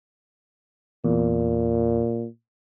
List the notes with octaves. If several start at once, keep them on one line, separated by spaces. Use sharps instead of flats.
E2 A#2